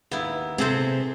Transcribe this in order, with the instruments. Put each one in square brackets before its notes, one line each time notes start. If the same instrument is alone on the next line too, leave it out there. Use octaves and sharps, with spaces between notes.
[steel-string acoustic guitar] D#2 [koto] B3 E4
[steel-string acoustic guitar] C3 C4 [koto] G#4 A4 C5